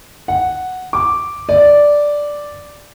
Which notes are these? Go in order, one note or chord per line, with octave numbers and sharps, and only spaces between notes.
F#5
D6
D5